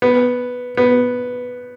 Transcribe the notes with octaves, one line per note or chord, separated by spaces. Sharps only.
B3
B3